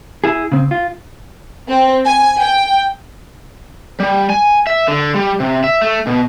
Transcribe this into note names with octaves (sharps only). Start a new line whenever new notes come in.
E4 G#4
C#3 C4
F4
C4
G#5
G5
G3
G#5
E5
D3
G3
C3
E5
A3
B2